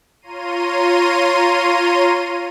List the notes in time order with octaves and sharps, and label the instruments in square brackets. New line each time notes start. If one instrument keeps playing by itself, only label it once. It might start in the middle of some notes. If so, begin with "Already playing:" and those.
[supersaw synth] F4 C#5 A#5 C6 D#7